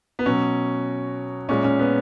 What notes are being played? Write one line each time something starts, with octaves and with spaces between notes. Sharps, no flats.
B3
B2 F#3 C#4
A#2 G#3 C#4
C#4
B3